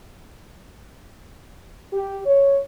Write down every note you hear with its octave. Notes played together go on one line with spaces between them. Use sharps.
G4
C#5